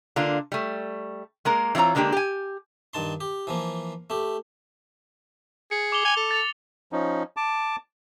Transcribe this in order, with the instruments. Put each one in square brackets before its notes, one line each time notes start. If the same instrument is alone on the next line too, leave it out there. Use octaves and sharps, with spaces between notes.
[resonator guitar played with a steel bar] D3 A#3 D4 F4
G3 A3
G#3 A#3 A#4
E3 C4 F4 C#5 A#5
D3 G#3 A#3 D4 G4
G4 G#5
[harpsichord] G2 D#3 A5 C6
G4
E3 F3 A#3
A3 G4
[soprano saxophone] G#4 [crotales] C#7
[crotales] D6 F7 G7
[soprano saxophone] G#5 [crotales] F7 G7
[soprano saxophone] A4
[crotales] A6 F7
[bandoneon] F3 C#4 D#4
A5 D6